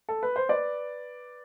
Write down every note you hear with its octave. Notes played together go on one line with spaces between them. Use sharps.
A4
B4
C5
B4 D5